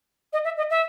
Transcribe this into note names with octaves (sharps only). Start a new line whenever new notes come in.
D#5
E5
D#5
E5